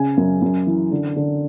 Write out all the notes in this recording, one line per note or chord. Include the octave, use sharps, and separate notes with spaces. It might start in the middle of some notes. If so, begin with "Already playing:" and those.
Already playing: C#3 G#5
F#2
F#2
E3
D3
D3